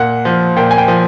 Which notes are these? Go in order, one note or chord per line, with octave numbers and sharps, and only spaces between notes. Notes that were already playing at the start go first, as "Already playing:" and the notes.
Already playing: A#2 F#5
F3
A#2 G5
G#5
G5
F3